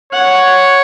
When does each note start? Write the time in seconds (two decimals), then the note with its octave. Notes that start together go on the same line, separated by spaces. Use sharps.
0.13 C#5 F#5